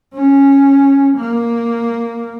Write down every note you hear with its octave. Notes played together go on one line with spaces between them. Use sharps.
C#4
A#3